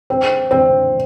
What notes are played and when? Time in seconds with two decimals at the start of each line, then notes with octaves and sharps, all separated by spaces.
0.10 C4
0.51 C4